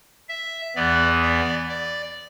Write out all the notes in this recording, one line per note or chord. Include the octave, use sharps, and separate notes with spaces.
E5
E2 E3 B3 D5
D5
D5